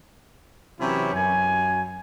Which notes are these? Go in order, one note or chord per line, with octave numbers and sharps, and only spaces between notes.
C3 E3 F#3 C#4 E4 G4
F#2 G#5